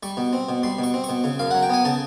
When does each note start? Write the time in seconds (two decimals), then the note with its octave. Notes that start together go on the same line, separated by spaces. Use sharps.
0.03 G3 C#6
0.17 B2
0.33 C4
0.49 B2
0.63 G3 C6
0.79 B2 C#6
0.94 C4
1.04 C#6
1.09 B2
1.24 C#3
1.39 F#2 F5
1.51 F#3 F#5
1.63 G5
1.70 B3 G#5
1.85 C#3 A5